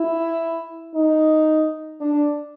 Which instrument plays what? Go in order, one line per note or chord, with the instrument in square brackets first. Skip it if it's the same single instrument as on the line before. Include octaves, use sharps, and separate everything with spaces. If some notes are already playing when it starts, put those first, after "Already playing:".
Already playing: [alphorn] E4
D#4
D4